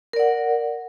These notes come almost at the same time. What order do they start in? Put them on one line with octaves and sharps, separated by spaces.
A#4 D5 F#5